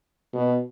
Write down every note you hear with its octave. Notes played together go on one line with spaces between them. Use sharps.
B2